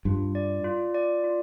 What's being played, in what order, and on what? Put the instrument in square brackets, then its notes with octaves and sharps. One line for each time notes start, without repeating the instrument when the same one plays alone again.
[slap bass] G2 [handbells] F4
[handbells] D5
F4
D5
F4